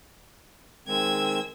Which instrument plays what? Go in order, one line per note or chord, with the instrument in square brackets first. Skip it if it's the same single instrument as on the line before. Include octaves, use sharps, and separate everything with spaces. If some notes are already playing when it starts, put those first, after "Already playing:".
[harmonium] D#3 G#3 C4 [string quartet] E6 G#6